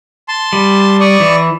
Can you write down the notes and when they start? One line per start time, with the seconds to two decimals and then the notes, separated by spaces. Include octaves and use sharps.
0.28 A5 C6
0.53 G3
1.00 D5 C#6 D#6
1.20 E3